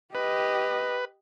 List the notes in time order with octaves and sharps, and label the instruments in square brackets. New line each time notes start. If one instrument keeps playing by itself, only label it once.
[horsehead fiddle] G4 D#5 [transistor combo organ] B4